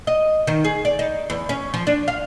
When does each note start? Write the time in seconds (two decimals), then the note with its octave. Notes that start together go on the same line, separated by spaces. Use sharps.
0.07 D#5
0.47 D#3
0.64 G#4
0.85 D5
0.99 D#4
1.30 E2
1.49 C#4
1.74 F3
1.87 D4
2.08 F5